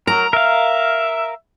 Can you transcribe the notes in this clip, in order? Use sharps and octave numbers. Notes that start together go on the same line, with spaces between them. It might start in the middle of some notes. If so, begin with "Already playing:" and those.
F#3 A#4 A#5
A#4 E5 F5